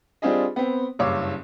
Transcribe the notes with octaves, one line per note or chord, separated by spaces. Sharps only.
G3 C4 D4 F4 G#4 D#5
B3 C4
F#1 G2 C#5 F5 D6 E6